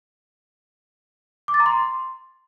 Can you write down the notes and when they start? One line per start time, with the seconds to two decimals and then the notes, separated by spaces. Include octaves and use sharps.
1.48 D6
1.54 A6
1.60 A#5
1.66 C6